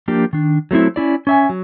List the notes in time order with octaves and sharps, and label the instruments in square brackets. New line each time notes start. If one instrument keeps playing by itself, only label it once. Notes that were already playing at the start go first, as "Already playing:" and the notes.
[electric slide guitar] F3 A#3 D4 G4
D#3 D4
F#3 A3 C4 E4
C#4 E4 D5
C#4 E5 G#5
F#3